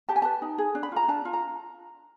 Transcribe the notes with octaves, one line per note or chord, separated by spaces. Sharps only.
G4 A5
G#5
B4 A5
D#4
G#4
D4
B5
F4 A#5
D4 A5
F4
A#5